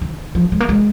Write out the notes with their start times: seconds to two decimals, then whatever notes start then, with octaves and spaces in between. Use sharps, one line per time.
0.01 D#3
0.35 F3
0.52 G#3
0.60 A#3
0.69 G#3